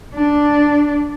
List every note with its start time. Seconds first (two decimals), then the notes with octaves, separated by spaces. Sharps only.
0.14 D4